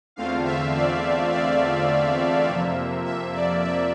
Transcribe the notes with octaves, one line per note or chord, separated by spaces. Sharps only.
E2 D3 A3 C4 F4 F5
E5
D5
D5
F2 C3 F3 A#3 E5
E5
D5
E5